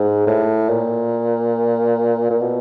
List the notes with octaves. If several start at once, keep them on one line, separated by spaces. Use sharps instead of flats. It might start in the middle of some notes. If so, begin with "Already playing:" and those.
Already playing: G#2
A2
A#2
A#2
B2